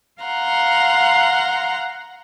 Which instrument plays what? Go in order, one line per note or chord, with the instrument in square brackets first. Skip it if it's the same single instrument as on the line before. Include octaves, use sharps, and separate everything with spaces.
[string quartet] F5 F#5 A#5 C6